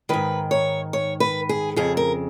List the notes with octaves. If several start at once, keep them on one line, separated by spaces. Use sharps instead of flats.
G#2 D#3 B4
C#5
C#5
B4
G#4
F2 C#3 G#4
A#4